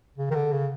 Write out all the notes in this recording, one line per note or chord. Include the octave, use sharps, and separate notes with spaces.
C#3
D#3
D3
C#3